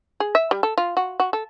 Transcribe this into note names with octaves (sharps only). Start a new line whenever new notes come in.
G#4
E5
G3
A4
F4
F#4
F#4
A4